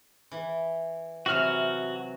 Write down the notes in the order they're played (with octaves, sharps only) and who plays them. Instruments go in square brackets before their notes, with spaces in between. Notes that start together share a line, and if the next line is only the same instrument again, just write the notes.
[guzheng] E3
[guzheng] C3 E3 F#3 [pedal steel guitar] F#4 F6